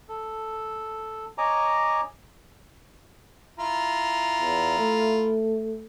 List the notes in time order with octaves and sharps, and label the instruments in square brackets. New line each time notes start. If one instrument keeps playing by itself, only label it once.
[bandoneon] A4
C#5 D#5 G#5 A#5 D6
[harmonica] E4 F4 A#5
[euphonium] E2
A3